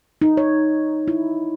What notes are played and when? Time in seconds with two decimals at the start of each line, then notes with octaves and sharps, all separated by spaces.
0.22 D#4
0.37 C#5
1.08 E4